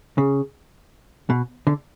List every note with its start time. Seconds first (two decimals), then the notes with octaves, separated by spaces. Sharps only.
0.18 C#3
1.30 B2
1.67 D3